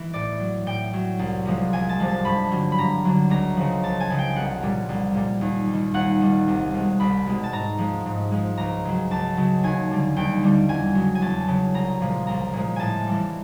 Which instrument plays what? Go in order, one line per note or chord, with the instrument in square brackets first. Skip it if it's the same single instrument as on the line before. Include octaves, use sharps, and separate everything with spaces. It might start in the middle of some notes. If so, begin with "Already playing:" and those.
Already playing: [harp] E3
A2 D5
F#3
A2 G5
F#3
C2
C3 F3 G#3
C2 G#5
A5
C3 F3 G#3
A5
G2 B5
D3 F#3
B5
G2 A#5
D3 F#3
C#2 A#5
C#3 F3
C#2 A5
G#5
C#3 F3
G5
C2 F#5
A#2 G3
C2
A#2 G3
D#2
G3
D#3
D#2 F#5
D#3 G3
C2
B2 G#3
C2 B5
B2 G#3
A5
G#2 A#5
F3 G#3
G#2
F3 G#3
C#2 A#5
C#3 F#3
C#2 A5
C#3 F#3
D#2 G#5
D3 G3
D#2 G5
D3 G3
E2 G#5
C#3 F#3
G#5
E2 A5
C#3 F#3
C2 A#5
A#2 F3 G#3
C2 A#5
A#2 F3 G#3
A2 G#5 A5
E3 G3